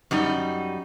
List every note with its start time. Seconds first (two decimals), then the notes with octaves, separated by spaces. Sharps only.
0.11 F#2 G3 D#4